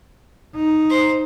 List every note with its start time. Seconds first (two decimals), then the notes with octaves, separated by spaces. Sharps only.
0.56 D#4
0.90 C5